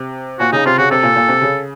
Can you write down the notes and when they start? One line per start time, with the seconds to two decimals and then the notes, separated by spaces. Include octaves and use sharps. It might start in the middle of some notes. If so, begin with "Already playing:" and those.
Already playing: C3
0.39 A#2 F#4
0.52 C#3 D#4
0.65 C3 F4
0.78 C#3 F#4
0.91 C3 A4
1.03 A#2
1.16 A#2
1.29 C3
1.42 C#3